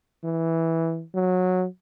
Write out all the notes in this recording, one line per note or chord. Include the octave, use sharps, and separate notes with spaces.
E3
F#3